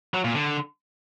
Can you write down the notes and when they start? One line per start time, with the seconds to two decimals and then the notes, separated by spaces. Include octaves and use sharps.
0.14 F#3
0.24 A#2
0.35 D3